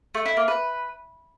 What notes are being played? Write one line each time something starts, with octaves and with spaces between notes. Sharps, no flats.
A3
E4
A#3
B4